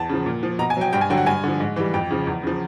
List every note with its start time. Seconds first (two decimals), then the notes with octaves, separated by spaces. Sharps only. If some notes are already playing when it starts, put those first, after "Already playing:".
Already playing: E2 A5
0.09 C#3 F3
0.26 A#2
0.43 F3
0.59 B2 A#5
0.70 G#5
0.77 F#3 G5
0.93 G2 G5
1.01 G#5
1.10 D3 F#3 G5
1.18 F#5
1.26 G2 G#5
1.44 D3 F3
1.60 G#2
1.76 E3 G3
1.94 F2 G5
2.10 C#3 F3
2.27 E2
2.43 C#3 F3